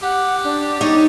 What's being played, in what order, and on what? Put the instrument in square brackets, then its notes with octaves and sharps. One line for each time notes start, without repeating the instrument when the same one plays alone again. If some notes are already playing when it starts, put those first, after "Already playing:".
[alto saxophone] G4 [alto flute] F#5
[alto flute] D4
[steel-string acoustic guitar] D#4 C#5 [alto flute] D5